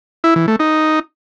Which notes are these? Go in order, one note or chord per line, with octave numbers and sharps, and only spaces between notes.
E4
E3
A3
D#4